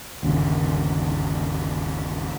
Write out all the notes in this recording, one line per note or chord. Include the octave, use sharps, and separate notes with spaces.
G1 D#2 C#3